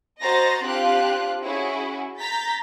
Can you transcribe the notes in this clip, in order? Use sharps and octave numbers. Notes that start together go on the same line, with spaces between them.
F#4 C5 D#5 A#5 A6 A#6
C4 D4 F4 G4 F5 F#6
C#4 E4 F#4 G#4
A#5 G6 A6 B6